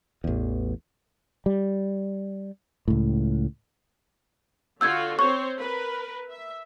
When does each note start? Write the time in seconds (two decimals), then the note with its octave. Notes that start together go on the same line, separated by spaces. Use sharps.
0.24 A1 E2
1.46 G3
2.88 C#2 A2
4.81 D3 F4 F#4 E6 G6 G#6
5.19 C4 C5 C#5 C#6
5.58 A#4 B4
6.29 E5